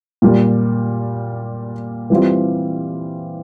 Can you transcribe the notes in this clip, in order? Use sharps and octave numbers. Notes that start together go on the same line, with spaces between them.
A#2 G3 A#3
E3 G3 C4 F4